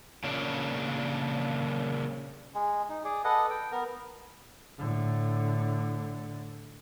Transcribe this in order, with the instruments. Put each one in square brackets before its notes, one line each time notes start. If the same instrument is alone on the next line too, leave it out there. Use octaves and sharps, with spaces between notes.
[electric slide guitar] A#2 C#3 D4
[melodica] G#3
D#4
G#4 D5
A4 B4 D#5 F#5
G5
B3 A#4
[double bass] A2 D3